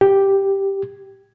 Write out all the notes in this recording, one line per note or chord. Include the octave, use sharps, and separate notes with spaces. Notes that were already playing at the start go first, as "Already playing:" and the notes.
G4